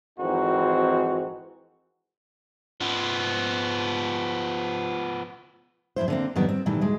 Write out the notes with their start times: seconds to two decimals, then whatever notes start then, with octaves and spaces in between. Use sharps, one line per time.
0.19 G#1 F2 E3 C4 D#4 F#4
2.81 F3 B3
5.96 F2 G#2 E4 C5
6.08 D3 A#3 C4
6.36 F2 D#3 G3 B3
6.49 C4
6.66 A#2 D#3 E3 G3 A3
6.81 D2 G#3